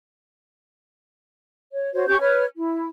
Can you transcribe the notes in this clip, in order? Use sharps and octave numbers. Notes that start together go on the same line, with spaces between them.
C#5
F#4 C5 C#5
C#4 G4 C#6 G6
B4 C#5 F6
E4